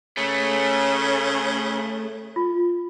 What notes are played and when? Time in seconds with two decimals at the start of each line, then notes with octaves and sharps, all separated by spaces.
0.17 C#3 A3
2.36 F4